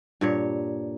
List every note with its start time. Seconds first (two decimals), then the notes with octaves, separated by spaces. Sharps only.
0.21 G2 A#2 C#5